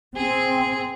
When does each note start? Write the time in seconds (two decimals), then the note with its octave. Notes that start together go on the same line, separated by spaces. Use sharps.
0.16 C4 G#4